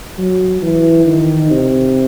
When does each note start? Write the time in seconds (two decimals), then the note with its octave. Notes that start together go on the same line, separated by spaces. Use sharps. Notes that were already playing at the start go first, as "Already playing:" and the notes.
0.18 F#3
0.62 E3
1.06 D#3
1.50 C3